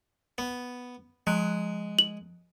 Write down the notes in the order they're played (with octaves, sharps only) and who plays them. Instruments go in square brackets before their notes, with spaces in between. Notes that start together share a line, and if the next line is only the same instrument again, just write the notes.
[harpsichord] B3
[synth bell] F3 F#6 D7 [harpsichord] G#3
[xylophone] F#7